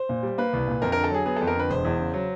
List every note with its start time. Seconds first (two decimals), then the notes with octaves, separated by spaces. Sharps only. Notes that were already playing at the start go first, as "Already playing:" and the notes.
Already playing: C5
0.09 A#2
0.23 G3
0.38 A#3 B4
0.53 C2
0.67 A#2
0.82 F2 A#4
0.92 D3 A#4
1.04 A4
1.11 F#3 G#4
1.25 B3 G#4
1.36 F2 A4
1.47 A#4
1.55 D3 B4
1.70 E1 C5
1.85 E2
1.99 C#3
2.14 F#3